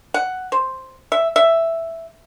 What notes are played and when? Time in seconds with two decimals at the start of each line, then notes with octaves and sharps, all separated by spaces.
0.14 F#5
0.52 C5
1.12 E5
1.36 E5